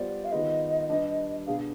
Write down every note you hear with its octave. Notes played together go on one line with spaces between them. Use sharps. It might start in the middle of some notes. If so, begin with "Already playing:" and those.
Already playing: G3 B3 F4 C5 D5
F5
D#3 B3 F4 G#4 B4 D#5
G3 D4 G4 B4
B2 B3 D4 G#4 B4 F5